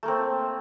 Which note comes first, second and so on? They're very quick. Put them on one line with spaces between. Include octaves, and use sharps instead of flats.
A3 A#3 C4